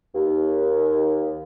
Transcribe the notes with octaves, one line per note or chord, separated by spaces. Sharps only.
D#2